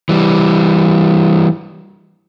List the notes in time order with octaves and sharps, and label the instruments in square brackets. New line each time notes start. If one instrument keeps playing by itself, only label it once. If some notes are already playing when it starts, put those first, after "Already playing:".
[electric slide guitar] E3 G3